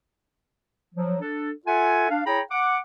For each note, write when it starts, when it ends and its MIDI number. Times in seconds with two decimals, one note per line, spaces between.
0.95 1.18 53
0.95 1.18 54
1.21 1.51 62
1.21 1.51 69
1.66 2.07 65
1.66 2.07 69
1.66 2.07 76
1.66 2.07 78
1.66 2.07 80
2.10 2.21 62
2.10 2.21 77
2.26 2.41 64
2.26 2.41 68
2.26 2.41 73
2.26 2.41 79
2.26 2.41 82
2.26 2.41 83
2.51 2.78 78
2.51 2.78 86